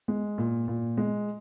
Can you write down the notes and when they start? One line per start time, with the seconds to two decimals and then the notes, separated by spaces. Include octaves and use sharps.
0.08 G#3
0.38 A#2
0.68 A#2
0.97 G#3